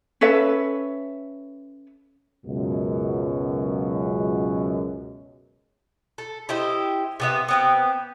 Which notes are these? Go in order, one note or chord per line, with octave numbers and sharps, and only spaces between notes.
C#4 A4 B4 E5
C#2 F#2 B2
A4
E4 G4 C5 D#5
C3 B3 E5
B3 C4 G4